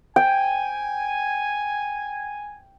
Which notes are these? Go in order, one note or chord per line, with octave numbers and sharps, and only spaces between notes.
G5 G#5